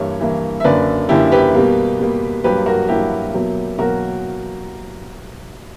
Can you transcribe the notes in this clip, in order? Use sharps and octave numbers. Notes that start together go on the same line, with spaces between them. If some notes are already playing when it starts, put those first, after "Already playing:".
Already playing: G2 E3 A#3 C#5 E5
G2 E3 A#3
E5
F#2 D3 A#3 B4 D5
F#2 D3 A#3 E4 G4
G4 B4
B2 G3 A#3
B2 G3 A#3
G2 F#3 A#3 G4 B4
F#4 A#4
G2 F#3 A#3 E4 G4
B2 F#3 A#3
B2 F#3 A#3 F#4 A#4